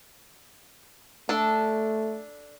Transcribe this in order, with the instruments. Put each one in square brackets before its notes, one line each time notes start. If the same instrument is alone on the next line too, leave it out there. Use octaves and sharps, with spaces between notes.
[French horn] A3 [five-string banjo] D4 A4